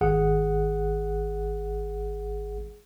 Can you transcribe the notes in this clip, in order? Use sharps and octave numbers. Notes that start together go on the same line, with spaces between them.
G#1 G#4 F#5